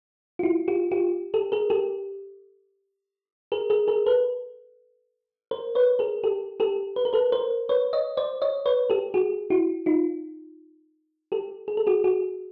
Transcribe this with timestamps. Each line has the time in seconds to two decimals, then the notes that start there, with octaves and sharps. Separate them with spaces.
0.39 F4
0.43 E4 F#4
0.68 F4 G4
0.91 F4 G4
1.34 G4 A4
1.52 G#4 A#4
1.70 G4 A4
3.52 G#4 A#4
3.70 G#4 A#4
3.88 G#4 A#4
4.06 A4 B4
5.51 A#4 C5
5.75 B4 C#5
5.99 G#4 A#4
6.24 G4 A4
6.60 G4 A4
6.96 B4
7.05 A#4
7.13 A4 B4
7.32 A#4 C5
7.69 B4 C#5
7.93 C#5 D#5
8.17 C5 D5
8.42 C#5 D#5
8.66 B4 C#5
8.90 G4 A4
9.14 F#4 G#4
9.50 E4 F#4
9.86 D#4 F4
11.32 G4 A4
11.68 G#4
11.77 A4
11.87 F#4 G#4
12.04 F#4 G#4